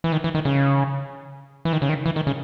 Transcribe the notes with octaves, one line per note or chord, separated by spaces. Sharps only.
E3
D#3
E3
D#3
C#3
E3
D#3
C#3
D#3
E3
D#3
C#3